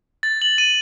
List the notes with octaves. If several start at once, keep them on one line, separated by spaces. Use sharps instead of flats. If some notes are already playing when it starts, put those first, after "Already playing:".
A6
F#7
D#7